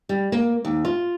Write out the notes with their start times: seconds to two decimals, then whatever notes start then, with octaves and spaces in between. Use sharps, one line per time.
0.09 G3
0.32 A#3
0.65 D#2
0.85 F4